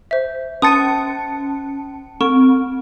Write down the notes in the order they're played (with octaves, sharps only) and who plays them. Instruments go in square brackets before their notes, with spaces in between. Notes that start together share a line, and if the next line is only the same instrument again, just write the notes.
[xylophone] C5 E5
[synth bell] C#4 A5 C#7 [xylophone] D#6 A6 D#7
[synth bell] C4 [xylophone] C#6